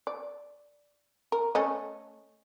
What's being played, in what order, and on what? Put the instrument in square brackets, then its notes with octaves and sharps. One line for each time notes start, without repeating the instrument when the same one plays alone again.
[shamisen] D5
A#4
A3 C#4 D#5